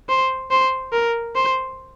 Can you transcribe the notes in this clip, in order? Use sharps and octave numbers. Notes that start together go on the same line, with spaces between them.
C5
C5
A#4
C5